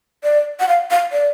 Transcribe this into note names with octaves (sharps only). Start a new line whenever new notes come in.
D5
F#5
F5
F5
D5